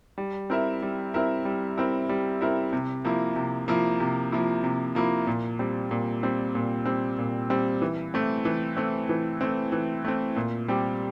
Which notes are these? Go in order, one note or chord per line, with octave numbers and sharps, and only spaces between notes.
G3
C4 E4 A#4 E5
G3
C4 E4 A#4 E5
G3
C4 E4 A#4 E5
G3
C4 E4 A#4 E5
C3
F3 A#3 E4
C3
F3 A#3 E4
C3
F3 A#3 E4
C3
F3 A#3 E4
A#2
G3 C4
A#2
G3 C4
A#2
G3 C4
A#2
G3 C4
E3
A3 C4
E3
A3 C4
E3
A3 C4
E3
A3 C4
A#2
G3 C4 G4